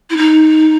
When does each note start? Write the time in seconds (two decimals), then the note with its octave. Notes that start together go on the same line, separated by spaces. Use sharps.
0.10 E4
0.17 D#4